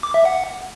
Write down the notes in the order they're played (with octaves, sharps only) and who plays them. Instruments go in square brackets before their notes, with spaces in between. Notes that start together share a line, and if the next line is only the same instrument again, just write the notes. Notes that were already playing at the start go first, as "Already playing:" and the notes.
[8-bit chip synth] D6
E5
F#5